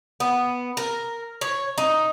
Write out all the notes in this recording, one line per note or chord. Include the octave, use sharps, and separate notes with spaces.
B3
A#4
C#5
D#4